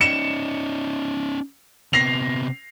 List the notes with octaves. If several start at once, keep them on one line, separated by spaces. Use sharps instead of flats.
C#4 D#4 C#7 E7
C3 B3 A#6 C7 F7